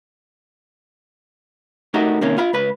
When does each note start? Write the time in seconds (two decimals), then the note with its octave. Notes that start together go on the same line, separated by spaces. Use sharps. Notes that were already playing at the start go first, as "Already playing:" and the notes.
1.94 A3 D#4 F#4 G4 A#4
2.21 C3 D#3 A#3 C#4
2.38 F4 F5 B5
2.53 C#2 B4 B5